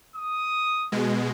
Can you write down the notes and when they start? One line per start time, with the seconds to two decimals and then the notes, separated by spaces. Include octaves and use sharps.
0.16 D#6
0.92 B2 G#3